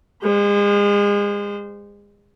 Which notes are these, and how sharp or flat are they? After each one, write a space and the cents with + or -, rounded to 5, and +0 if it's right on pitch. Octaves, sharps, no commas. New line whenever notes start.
G#3 -35 C5 -20